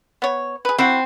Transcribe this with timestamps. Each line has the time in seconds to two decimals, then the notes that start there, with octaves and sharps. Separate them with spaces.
0.22 B3 C#5
0.65 G#4 B4
0.79 C4 E4 F#4